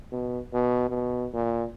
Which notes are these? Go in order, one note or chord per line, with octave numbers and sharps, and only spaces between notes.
B2
B2
B2
A#2